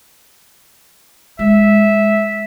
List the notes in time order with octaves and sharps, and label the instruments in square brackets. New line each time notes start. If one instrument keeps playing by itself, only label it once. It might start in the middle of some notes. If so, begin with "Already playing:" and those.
[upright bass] G#3 [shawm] E5